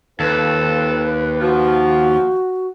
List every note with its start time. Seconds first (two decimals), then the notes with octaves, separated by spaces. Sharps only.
0.20 D#2 C4 F4 A4 B4
1.41 F3 F#4